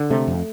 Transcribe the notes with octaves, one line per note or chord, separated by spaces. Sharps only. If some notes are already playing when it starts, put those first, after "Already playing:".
Already playing: D3
C3 A3
F2